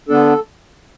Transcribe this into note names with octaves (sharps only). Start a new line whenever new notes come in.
D3 B3 D4 A4